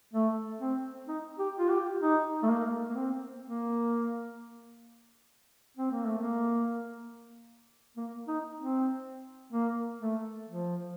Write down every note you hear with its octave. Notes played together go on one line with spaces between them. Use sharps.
A3
C4
D#4
G4
F4
G4
D#4
A3
A#3
A#3
C4
A#3
C4
A#3
A3
A#3
A#3
D#4
C4
A#3
A3
F3